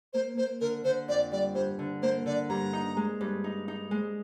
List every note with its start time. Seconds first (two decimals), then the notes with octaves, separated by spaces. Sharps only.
0.13 A#3 C5
0.37 A#3 C5
0.61 D3 A#4
0.84 D3 C5
1.08 F2 D5
1.32 G3 D5
1.55 G2 C5
1.79 D3
2.02 A#3 C5
2.26 D3 D5
2.49 G2 A#5
2.73 D#4
2.97 G#3
3.21 G2
3.44 D#4
3.68 D#4
3.91 G#3